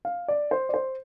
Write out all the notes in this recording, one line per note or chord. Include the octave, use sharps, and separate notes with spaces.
F5
D5
C5
D5
C5